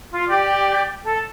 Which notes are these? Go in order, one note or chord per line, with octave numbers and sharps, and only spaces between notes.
F4
G4 D5
A4